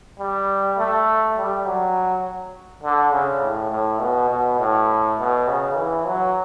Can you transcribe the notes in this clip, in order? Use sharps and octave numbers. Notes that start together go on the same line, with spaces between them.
G3
A3
G3
F#3
D3
C#3
A2
A2
B2
B2
A2
B2
C#3
E3
F#3